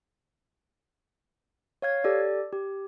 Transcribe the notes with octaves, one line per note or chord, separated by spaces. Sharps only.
C#5 F5 G#6
G4 A4 D5
G4